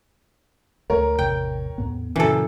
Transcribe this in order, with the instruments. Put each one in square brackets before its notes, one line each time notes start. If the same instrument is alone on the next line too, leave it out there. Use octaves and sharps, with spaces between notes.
[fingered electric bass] D2 A3 [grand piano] A#4 C#5
[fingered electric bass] A1 E2 C3 [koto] G5
[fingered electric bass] E2 A2 B3
[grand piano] F#2 [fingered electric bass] A#2 C#3 [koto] E3 A4